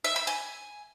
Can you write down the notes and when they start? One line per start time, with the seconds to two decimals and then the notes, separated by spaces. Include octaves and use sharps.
0.04 E5
0.16 B5
0.27 G#5